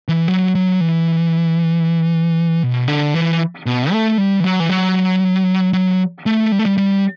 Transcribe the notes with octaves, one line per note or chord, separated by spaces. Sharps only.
E3
F#3
F#3
E3
B2
D3
E3
B2
A3
G3
E3
F#3
E3
F#3
F#3
A3
G3
A3
G3
G3